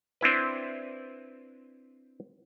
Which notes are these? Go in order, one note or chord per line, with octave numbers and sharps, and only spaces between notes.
C4 D4 E4 B4